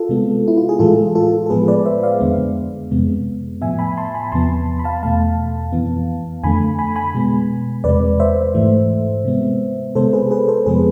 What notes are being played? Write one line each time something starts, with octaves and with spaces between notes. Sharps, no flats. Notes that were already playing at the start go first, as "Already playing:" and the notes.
Already playing: F4 A4
C3 G#3 B3
E4
F4
G#4
A2 E3 G#3 F4 A4
F4 A4
A4
A2 F3 G#3 B3 G#4 B4
B4 D5
C5 E5
D5 F5
F2 D3 G#3 B3
F2 C3 G#3 B3
A2 F3 B3 E5 G#5
G#5 B5
A5 C6
G#5 B5
E2 C3 F3 B3 A5 C6
B5
F5 A5
E2 B2 A3 F5 A5
F2 E3 B3
F2 D3 A3 G#5 B5
G#5 B5
G#5 B5
B2 G#3 B3
E2 C3 G#3 B4 D5
C5 E5
G#2 E3 A3
C3 G#3 B3
C3 G#3 B3 A4 C5
G#4 B4
G#4 B4
A4 C5
F2 C3 F3 G#3 B3 G#4 B4